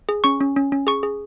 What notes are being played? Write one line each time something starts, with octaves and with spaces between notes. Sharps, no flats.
G#4
C#4 C#6
C#4
C#4
C#4
G#4 C#6
G#4